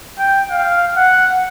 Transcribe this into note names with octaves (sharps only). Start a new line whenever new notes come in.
G5
F5
F#5